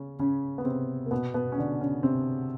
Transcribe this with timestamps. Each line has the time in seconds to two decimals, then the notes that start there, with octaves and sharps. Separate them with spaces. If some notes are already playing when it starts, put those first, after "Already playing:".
Already playing: C#3 C#4
0.19 C#3 C#4
0.58 B3
0.65 C3 C4
1.06 A#3
1.11 B2 B3
1.34 B2 B3
1.52 C#4
1.58 D3 D4
1.80 C#3 C#4
2.03 C3 C4